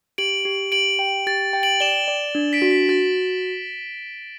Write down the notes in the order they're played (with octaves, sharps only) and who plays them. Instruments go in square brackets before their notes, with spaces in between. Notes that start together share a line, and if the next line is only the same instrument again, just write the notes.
[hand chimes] G4 [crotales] D7 F#7
[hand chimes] G4
[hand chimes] G4 [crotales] D7 F#7
[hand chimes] G5
[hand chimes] G4 [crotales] A6
[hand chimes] G5
[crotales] D7 F#7
[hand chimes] D5 [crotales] E7 G7
[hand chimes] D5
D4
[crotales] B6 D7
[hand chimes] F#4
[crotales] B6
[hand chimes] F#4 [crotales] A6